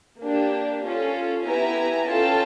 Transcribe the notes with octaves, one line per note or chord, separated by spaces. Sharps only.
A#3 D4 G4
C#4 F4 A4
B3 E4 G4 G#5 A#5
C#4 F4 A4 G5 A5